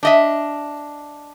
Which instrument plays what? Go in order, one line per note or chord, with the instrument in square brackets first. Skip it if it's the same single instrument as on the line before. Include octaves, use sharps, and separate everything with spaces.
[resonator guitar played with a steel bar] D4 D#5 E5